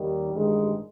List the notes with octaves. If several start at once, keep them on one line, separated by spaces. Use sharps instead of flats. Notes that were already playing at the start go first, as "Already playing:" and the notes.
Already playing: D#2 D#3 G3
A1 G2 D#3 G#3